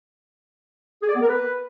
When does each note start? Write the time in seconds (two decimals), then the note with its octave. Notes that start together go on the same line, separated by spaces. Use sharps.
1.02 G#4
1.09 D5
1.15 B3
1.21 A#4
1.28 B4